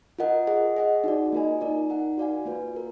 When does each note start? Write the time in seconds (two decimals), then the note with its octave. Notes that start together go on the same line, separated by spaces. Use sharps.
0.19 F4 A#4 D#5 F#5
0.47 G#4 D#5 F#5
0.76 G#4 D#5 F#5
1.04 D#4 F#4 D5
1.33 A#3 F4 A#4 D#5 G#5
1.61 D#4 A#4 D5
1.90 D#4 A#4 D5 F#5
2.17 F#4 D5 F5 G#5
2.46 A#3 F4 B4
2.74 F#4 A#4